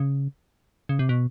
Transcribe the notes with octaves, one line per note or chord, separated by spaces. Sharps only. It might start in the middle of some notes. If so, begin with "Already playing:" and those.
Already playing: C#3
C#3
C3
B2